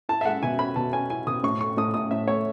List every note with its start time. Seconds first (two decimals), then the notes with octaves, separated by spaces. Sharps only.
0.09 E4 A5
0.21 E5
0.25 G#3 F#5
0.43 B2 G#5
0.59 C#4 B5
0.76 B2 A5
0.93 C#4 G#5
1.10 E4 G#5
1.26 B2 D#6
1.43 A2 C#6
1.60 A3 C#6
1.77 A2 D#6
1.94 A2 D#6
2.11 A2 E5
2.28 A3 C#5